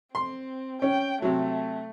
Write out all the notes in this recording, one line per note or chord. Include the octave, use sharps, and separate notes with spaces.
C4 C6
C#4 G5
C3 F#3 A3